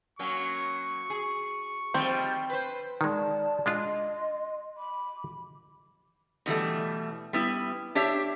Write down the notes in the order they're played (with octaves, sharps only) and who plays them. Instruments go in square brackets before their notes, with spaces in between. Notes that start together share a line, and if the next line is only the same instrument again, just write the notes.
[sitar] F#3 A#3 C#4 [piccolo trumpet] C#6
[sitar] G#4
[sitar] D#3 F3 G3 [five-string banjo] C4
[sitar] B4 C5
[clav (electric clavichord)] D#3 G#3 [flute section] D5 A5
[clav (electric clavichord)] G#3 D4 F4 [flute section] D#5 C6
[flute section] B5 D6
[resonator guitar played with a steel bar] B2 E3 G3 A3
G3 B3 E4
D4 G4 C#5 E5